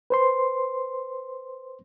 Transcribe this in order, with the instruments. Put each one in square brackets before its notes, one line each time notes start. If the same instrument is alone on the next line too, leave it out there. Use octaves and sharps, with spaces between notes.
[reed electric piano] B4 C5 C6